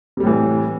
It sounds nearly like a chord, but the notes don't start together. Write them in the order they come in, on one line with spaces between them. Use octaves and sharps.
C3 G3 A2 E3